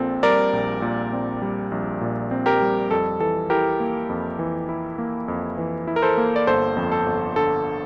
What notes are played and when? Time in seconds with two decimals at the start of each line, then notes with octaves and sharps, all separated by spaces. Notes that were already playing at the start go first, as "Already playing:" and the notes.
Already playing: A#1 A#2 C4 A4
0.23 G3 A#4 D5
0.53 A#1
0.82 A#2
1.13 C4
1.42 G3
1.72 A#1
2.01 A#2
2.31 C4
2.46 G4 A#4
2.61 G3
2.91 F2 A4
3.20 E3 A4
3.50 E4 G4 A#4
3.80 A#3
4.09 F2
4.39 E3
4.69 E4
4.98 A#3
5.28 F2
5.58 E3
5.87 E4
5.96 A#4
6.02 A4 C5
6.18 A#3
6.36 D5
6.47 G1 A4 C5
6.77 F2
6.92 A4
7.06 G1
7.36 D3 A4